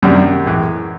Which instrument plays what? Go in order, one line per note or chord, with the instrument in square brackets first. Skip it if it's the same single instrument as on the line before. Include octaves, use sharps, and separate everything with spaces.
[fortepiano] F#2 [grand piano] C3 D#3 G3 A#3 D4
[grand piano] A2 E3 G#3